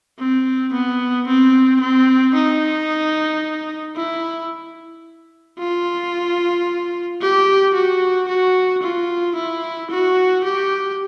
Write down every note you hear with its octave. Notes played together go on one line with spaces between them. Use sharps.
C4
B3
C4
C4
D#4
E4
F4
G4
F#4
F#4
F4
E4
F#4
G4